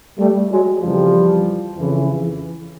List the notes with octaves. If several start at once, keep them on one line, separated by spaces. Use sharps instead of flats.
G3 A3
F#3 G#3
F2 C#3 E3 F3 G3
F2 C#3 E3